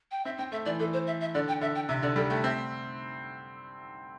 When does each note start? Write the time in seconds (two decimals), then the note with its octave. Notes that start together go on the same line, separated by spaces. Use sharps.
0.11 G5
0.25 C4 E5
0.38 C4 G5
0.52 A3 E5
0.66 E3 D5
0.79 E3 A4
0.93 C5
1.07 E5
1.21 E5
1.35 D3 D5
1.48 G5
1.61 D3 E5
1.75 G5
1.88 C3 E5
2.02 D3 D5
2.16 G3 A4
2.30 A3 G5
2.44 C4 E5